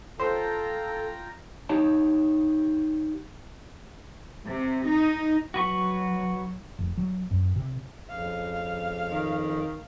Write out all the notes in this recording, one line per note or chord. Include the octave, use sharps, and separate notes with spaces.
F4 A4 C5 G5 A#5
D#4 G4 C#5 A5
C3
D#4
F#3 F#4 B4 C#6
F1
F#3
F#2
C3
F2 C#3 F5
D#3